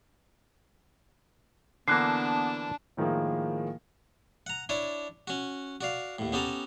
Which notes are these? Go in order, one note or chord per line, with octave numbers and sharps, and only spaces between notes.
D3 E3 A#3 B3 D4 A5 F#6 C7
A2 D#3 F3 G#3 A#3
F#5 A#5
D4 E4 C#5 D5 A5
C#4 F#4
F#4 D5 F5
D#2 A2
B3 C#4 G4 A4 A5 A#5